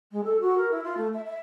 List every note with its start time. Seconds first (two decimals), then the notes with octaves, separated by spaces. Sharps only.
0.12 G#3
0.24 A4
0.40 F#4
0.57 A#4
0.71 E4
0.84 F4
0.97 A3
1.13 E5
1.25 E5